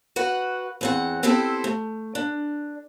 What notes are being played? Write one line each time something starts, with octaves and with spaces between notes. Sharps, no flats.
F#4 B4 F#5
E2 C4 F#5
B3 C4 E4 G4 A4 C5
A3
D4